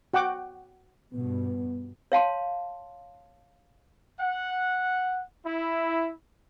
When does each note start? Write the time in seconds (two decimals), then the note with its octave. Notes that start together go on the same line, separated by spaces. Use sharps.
0.14 F#4 F#5 G5 D6
1.13 G2 B2 B3
2.12 C#5 F5 A5 C6
4.20 F#5
5.45 E4